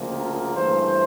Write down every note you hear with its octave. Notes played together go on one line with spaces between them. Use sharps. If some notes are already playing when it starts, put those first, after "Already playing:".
Already playing: D2 C#3 F3 A#3
A#4
G2 E3 A3 C5